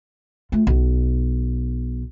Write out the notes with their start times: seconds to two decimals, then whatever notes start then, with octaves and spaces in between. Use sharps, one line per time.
0.52 A3 F4
0.67 B1